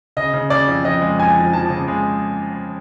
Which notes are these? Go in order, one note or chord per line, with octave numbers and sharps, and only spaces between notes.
C#3 D#5
C#3
C#3 D5
F2
F2 D#5
G#3
F2 G#5
F3
F3 A5
C#3
G#3